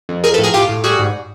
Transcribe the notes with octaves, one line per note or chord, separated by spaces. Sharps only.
F2
F3 G#4 A#4
A4 B4
A2
G#4 A#4
A2 F4 G4
A2
G3 F#4 G#4
G#2